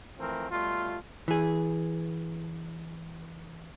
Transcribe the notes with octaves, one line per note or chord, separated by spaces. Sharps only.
E3 F3 A3 C4 A#4
B2 G3 A3 F4
E3 G#4